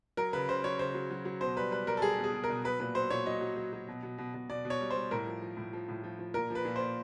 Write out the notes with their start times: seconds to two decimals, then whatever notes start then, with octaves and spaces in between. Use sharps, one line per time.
0.17 F#3 A#4
0.33 C#3 B4
0.48 C#3 C5
0.64 F#3 C#5
0.79 C#3 C5
0.94 F#3
1.11 F#3
1.25 F#3
1.41 B2 C5
1.56 G3 B4
1.71 G3 B4
1.87 G3 A#4
1.97 A4
2.02 G3 G#4
2.18 B2
2.24 G#4
2.33 B2
2.44 A#4
2.50 B2
2.64 F#3 B4
2.80 A#2 B4
2.95 F#3 C5
3.10 A#2 C#5
3.26 F#3 D#5
3.41 F#3
3.56 F#3
3.73 F#3
3.88 B2
4.03 B2
4.18 B2
4.34 B2
4.49 B2 D5
4.65 B2
4.70 C#5
4.81 G3
4.90 C5
4.96 G3
5.11 A2 A#4
5.27 F3
5.42 F3
5.57 A2
5.73 F3
5.89 A2
6.04 F3
6.19 F3
6.34 A#2 A#4
6.50 F3
6.55 B4
6.65 A#2
6.76 A#2 C5